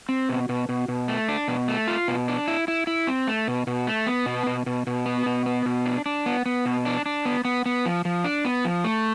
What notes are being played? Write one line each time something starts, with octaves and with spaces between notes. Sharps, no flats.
C4
B2
B2
B2
B2
A3
D4
B2
A3
F4
B2
D4
E4
E4
E4
C4
A3
B2
B2
A3
B3
B2
B2
B2
B2
B3
B2
B3
B2
D4
D4
B3
B3
B2
D4
D4
B3
B3
B3
F3
F3
D4
B3
F3
A3